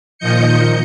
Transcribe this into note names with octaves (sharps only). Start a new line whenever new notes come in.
A#2 D#3 F3 D#5 G6 C#7